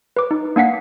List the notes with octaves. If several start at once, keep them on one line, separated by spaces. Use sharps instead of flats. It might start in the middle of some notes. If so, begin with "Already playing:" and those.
B4 D6
D#4
A#3 D4 F#5 B6 C7